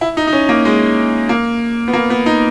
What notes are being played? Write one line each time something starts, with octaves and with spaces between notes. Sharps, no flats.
E4
D#4
D#4
C#4
A#3
G#3
A#3
B3
A#3
B3
D#4